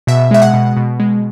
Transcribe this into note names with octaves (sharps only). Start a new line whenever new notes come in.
B2 E5
G#3 E5
F#5
B2
B2
G#3